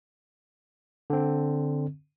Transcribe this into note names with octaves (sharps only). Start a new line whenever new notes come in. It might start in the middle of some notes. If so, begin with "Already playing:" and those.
D3 C4